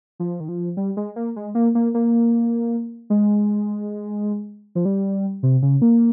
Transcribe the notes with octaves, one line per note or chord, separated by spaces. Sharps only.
F3
D#3
F3
G3
G#3
A#3
G#3
A#3
A#3
A#3
G#3
F3
G3
C3
C#3
A#3